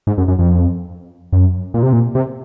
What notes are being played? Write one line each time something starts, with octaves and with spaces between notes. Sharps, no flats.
G#2
F#2
F#2
F2
F#2
A#2
C3
A#2
C3